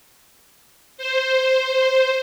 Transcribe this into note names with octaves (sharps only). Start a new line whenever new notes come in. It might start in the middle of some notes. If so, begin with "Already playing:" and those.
C5